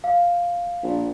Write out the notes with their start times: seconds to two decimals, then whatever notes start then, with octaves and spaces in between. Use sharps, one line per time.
0.04 F5
0.83 A#1